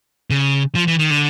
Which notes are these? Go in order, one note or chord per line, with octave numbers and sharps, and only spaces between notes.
C#3
F3
E3
D#3
D3